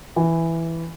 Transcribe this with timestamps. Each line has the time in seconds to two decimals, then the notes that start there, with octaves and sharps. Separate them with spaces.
0.16 E3